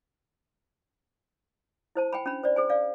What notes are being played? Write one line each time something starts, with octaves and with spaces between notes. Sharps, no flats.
E4 C5 A5
G5 G#5 B5
C#4 D4 B5
C5 D5
G#4 C5 G#5
D5 F5